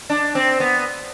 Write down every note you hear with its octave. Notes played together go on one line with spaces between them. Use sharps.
D4
C4
B3